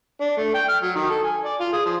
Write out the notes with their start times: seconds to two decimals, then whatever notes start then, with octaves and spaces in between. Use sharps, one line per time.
0.21 D4
0.37 A3
0.54 G5
0.69 F6
0.82 F#3
0.95 D#3
1.09 A4
1.24 G#5
1.45 D5
1.60 F4
1.73 G#4
1.86 F3